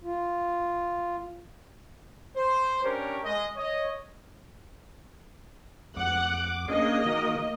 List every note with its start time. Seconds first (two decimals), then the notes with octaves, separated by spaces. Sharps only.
0.04 F4
2.36 C5
2.84 C#4 D4 G4 A#4 C#5
3.24 G#3 D#5
3.56 C#5 D#5
5.96 F2 F#5 D6
6.68 A#3 C#4 D4 G#4 D#5
7.05 D#3 F#4 A#4